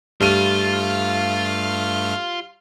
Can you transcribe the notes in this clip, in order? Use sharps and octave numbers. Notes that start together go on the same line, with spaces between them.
G2 G3 A3 F4 F6 D#7